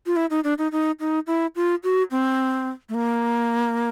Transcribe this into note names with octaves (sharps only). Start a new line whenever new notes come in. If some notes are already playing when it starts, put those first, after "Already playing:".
F4
E4
D#4
D4
D#4
D#4
D#4
E4
F4
F#4
C4
A3
A#3